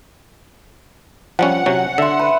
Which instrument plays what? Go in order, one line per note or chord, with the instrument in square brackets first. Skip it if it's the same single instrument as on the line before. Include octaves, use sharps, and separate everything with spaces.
[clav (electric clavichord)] F3 G3 C#4 [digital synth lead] F#5
[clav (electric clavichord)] C3 F#3 C#4
[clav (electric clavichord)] D3 [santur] E5 C6
[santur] B4